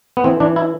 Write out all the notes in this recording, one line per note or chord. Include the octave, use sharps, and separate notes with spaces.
B3
E3 C4
E3 D4
E4